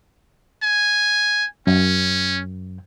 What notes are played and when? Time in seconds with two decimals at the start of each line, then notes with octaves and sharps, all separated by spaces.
0.63 G#5
1.67 F#2 C#4